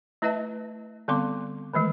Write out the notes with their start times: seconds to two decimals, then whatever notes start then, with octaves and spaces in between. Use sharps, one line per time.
0.22 A3 E4 B4 D#5 E5 A5
1.08 D3 G3 B3 C4 C6 D6
1.74 D#3 E3 G#3 A3